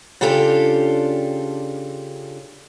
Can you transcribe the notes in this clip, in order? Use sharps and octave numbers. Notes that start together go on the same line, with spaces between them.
C#3 D4 F4 G4 A4